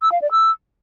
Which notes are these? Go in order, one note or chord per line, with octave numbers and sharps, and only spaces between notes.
E6
F5
D5
E6